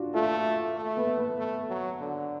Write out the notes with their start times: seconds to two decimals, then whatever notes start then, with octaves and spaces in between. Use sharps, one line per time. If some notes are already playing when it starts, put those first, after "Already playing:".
Already playing: D4 F4 F#4
0.14 A3 F4
0.76 A3
0.97 B3
1.17 B3
1.38 A3
1.69 F#3
2.00 D3